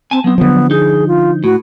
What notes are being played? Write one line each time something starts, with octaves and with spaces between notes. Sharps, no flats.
C4 G#5 A5
F#3 B3 C4
D3 F3 B3
D#4 G#4
F4
A2 F#4